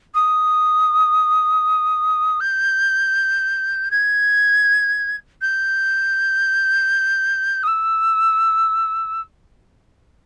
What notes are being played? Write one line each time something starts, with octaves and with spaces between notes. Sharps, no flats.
D#6
G6
G#6
G6
D#6
E6